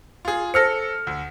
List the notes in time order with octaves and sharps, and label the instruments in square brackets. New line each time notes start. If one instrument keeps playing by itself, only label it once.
[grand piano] F4 G#4
[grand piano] A4 F6 C#7 [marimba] C5 E6 A#6
[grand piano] D2